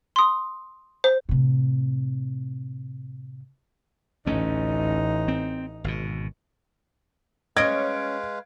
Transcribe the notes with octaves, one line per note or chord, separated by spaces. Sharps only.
C6 D#6
C5
A2 C3
A1 D2 A3 C#4 D#4
C4
G#1 B2
G#3 C#4 B4 D#5 F5 G#6 D7